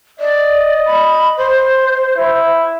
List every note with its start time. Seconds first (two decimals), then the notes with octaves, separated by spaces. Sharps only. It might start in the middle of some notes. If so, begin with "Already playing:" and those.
0.20 D5 D#5
0.86 B5
1.37 C5
2.17 E4